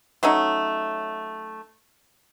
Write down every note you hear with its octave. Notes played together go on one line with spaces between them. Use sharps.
F#3 A3 C#4 D#4